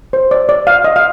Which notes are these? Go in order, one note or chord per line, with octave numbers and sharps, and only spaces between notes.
C5
D5
D5
F5
D#5
F5